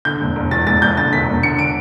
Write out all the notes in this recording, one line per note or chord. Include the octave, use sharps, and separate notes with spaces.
D3 G6
E1
E1
E2 A6
E1 A6
E1 G6
D3 A6
E1 B6
E1
D3 C#7
D7